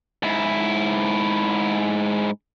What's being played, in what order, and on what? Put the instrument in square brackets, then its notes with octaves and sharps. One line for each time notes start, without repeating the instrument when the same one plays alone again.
[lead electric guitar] G#2 E4